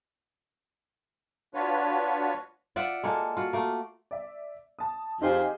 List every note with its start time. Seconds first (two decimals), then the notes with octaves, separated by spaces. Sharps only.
1.54 D4 F4 F#4 B4 C#5
2.76 F4 D5 E5 F#5
3.03 G#3 A#3 A4
3.37 F4 F#4
3.53 A3 A#3
4.11 D5 E5
4.79 A5 D#6
5.21 F2 D#4 F4 G4 G#4 C5